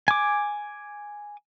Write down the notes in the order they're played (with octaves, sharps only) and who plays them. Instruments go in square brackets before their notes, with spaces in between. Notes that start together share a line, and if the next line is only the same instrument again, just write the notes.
[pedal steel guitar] G#5 D6